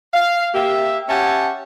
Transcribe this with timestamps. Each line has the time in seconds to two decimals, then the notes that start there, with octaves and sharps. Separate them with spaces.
0.14 F5
0.54 A#3 G4 E5
1.09 C#4 G4 E5 F#5 G#5 A5